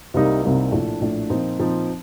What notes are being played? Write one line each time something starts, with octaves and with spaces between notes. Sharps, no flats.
C2 C3 G3 A#3 D#4
C2 C3 G3 A#3 D#4
A#1 A2 A3 D4
A#1 A2 A3 D4
A#2 F3 C4 D#4
A#2 F3 C4 D#4